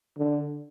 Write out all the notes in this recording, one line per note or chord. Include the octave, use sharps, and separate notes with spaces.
D3